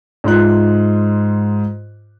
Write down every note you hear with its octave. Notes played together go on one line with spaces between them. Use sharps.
G#2 F4 F#6